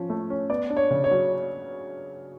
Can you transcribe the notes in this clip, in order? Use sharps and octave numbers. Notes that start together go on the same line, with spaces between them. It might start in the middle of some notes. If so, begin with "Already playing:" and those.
Already playing: F3 C#4
A3
C#4
B3 D5
D4
C#5
C#3
C#5
F#3